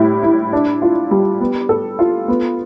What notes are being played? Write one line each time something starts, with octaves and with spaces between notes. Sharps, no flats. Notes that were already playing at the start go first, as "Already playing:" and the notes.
Already playing: A2 G3 E4
E4
D4
F4
G3
B3
A4
F4
B3